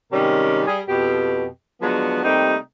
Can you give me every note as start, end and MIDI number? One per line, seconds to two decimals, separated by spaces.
0.12 0.61 44
0.12 0.61 48
0.12 0.61 51
0.12 0.61 55
0.12 0.61 61
0.12 0.61 70
0.66 0.80 55
0.66 0.80 68
0.88 1.45 41
0.88 1.45 47
0.88 1.45 67
1.82 2.23 50
1.82 2.23 53
1.82 2.23 54
1.82 2.23 56
1.82 2.23 59
2.25 2.55 48
2.25 2.55 55
2.25 2.55 57
2.25 2.55 58
2.25 2.55 60
2.25 2.55 63